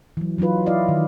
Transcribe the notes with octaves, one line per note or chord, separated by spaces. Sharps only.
E3 F#3
E3 F#3 D#4 F4 B4
E4 F4 D5 D#5 F5
D#3